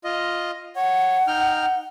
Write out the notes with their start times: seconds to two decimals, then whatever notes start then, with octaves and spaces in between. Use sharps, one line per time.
0.04 F4 D#5
0.76 C#5 F#5
1.27 D#4 G5 F6